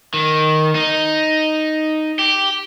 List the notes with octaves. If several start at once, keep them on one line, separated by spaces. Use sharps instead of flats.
D#3
D#4
G4